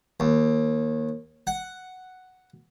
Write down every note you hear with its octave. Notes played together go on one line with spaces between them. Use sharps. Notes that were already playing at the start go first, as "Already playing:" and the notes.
D#2
F#5